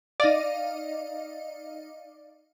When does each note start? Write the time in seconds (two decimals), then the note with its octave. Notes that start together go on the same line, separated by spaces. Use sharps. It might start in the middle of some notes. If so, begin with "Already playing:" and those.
0.20 D#4 D5 D#5 F5